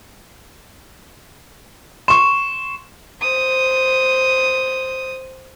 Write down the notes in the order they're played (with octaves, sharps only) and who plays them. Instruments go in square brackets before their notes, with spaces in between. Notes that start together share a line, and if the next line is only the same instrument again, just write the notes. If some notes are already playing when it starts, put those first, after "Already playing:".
[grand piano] C6 C#6 [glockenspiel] E7
[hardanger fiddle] C5 D#6